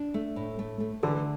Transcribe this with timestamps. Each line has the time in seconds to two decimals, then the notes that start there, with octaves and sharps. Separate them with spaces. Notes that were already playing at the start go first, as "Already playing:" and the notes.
Already playing: D4
0.14 A3
0.36 A2
0.59 A3
0.80 A3
1.03 D3 E3